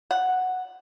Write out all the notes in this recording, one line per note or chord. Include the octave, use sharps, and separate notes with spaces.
F#5